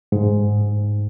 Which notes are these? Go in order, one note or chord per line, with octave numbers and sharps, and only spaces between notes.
G#2